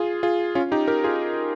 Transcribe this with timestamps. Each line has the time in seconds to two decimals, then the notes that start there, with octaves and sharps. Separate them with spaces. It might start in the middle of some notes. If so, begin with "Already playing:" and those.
Already playing: F4 G#4
0.23 F4 G#4
0.55 C#4 F4
0.72 D#4 G4
0.88 G4 A#4
1.04 F4 G#4